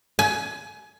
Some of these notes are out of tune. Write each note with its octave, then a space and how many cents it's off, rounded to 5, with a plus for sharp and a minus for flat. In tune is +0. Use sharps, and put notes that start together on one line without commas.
G#5 +30